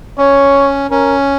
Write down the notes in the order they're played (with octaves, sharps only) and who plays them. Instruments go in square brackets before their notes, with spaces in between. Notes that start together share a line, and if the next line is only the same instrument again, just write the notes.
[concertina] C#4 [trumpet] C#5
[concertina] C#4 [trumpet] A#4